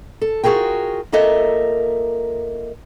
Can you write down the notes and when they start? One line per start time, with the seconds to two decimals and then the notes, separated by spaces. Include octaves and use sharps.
0.21 A4
0.43 F4 F#4 G#4 A#4 G5
1.12 A#3 F4 A4 A#4 D#5 E5